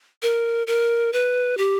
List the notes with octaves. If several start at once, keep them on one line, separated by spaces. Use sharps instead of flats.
A#4
A#4
B4
G4